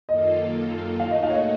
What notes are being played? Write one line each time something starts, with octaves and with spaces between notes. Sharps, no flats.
F#2 D#3 A#3 F4 A4 D#5
A#2 A3 D#4 F#4 F5
D#5
F5
C#5
D#5